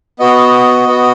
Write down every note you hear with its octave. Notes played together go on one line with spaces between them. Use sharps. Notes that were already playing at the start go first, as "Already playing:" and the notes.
B3 F#4 D#5
B3 F#4